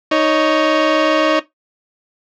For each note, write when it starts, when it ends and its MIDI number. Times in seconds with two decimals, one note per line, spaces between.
0.11 1.39 63
0.11 1.39 73